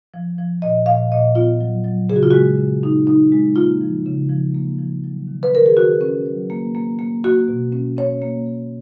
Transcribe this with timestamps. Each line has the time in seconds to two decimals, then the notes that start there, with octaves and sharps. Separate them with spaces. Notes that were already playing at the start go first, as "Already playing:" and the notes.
0.14 F3
0.38 F3
0.62 A#2 D#5
0.86 A#2 F5
1.12 A#2 D#5
1.35 B3 F4
1.61 F#3
1.85 F#3
2.09 C#3 G#4
2.16 F#4
2.23 F4
2.30 G#3 F#4
2.58 C#3
2.83 D#4
3.07 D#4
3.32 G#3
3.56 A#3 F4
3.81 F3
4.06 C#3
4.29 F3
4.54 A#3
4.79 F3
5.04 F#3
5.27 D#3
5.43 B4
5.53 D#3 A#4
5.66 G#4
5.77 D#3 F#4
6.01 C#4
6.26 F#3
6.50 A#3
6.75 A#3
6.99 A#3
7.24 A#3 F#4
7.48 B2
7.72 C#4
7.97 C#4 C#5
8.22 A#3
8.46 A#3